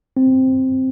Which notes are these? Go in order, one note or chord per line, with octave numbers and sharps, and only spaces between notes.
C4